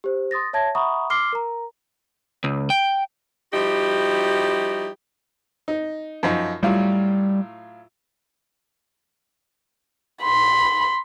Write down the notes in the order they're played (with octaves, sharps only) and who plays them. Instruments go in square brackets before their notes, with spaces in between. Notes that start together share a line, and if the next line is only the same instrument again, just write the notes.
[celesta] G4 C5
C6 D#6 A6 A#6
C#5 E5 A5 G#6 A#6
E5 F#5 A#5 B5 C#6 D#6
C6 D6 F6 C7 G7
A#4 A#5
[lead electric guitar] C#2
G5
[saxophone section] F3 G3 D#4 E4 F#4 G4
[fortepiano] D#4
F#2 F3 D#4
[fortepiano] A2 F#3 F4 [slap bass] G3
[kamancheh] B5 C6